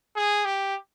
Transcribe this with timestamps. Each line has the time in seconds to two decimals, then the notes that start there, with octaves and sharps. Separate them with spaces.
0.16 G#4
0.45 G4